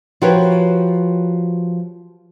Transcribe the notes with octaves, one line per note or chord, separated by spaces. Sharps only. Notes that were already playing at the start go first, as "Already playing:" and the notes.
F3 F#4 G4 A#4 B4 C#5